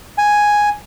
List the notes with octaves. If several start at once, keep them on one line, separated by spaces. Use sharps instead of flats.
G#5